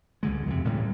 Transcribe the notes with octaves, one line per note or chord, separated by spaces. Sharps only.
C#2 D3 G#3
F2 C3
A1 A2 G3 G#3